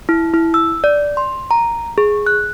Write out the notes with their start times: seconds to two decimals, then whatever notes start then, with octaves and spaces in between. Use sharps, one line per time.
0.09 E4
0.34 E4
0.54 E6
0.84 D5
1.17 C6
1.51 A#5
1.98 G#4
2.27 F#6